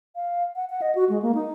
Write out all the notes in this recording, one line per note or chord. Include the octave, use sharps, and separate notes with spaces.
F5
F#5
F#5
D#5
F#4
G#3
A#3
D#4